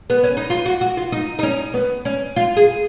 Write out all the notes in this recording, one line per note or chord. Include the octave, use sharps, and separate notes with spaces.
B3
C#4
D#4
F4
F#4
F#4
F4
D#4
D#4
C#4
B3
C#4
F4
G#4